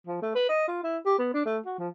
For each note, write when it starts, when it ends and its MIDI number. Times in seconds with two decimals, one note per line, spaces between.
0.07 0.22 53
0.22 0.33 57
0.35 0.45 71
0.49 0.67 75
0.68 0.83 65
0.84 0.98 64
1.05 1.18 67
1.19 1.29 59
1.34 1.42 62
1.45 1.58 57
1.66 1.76 66
1.79 1.88 53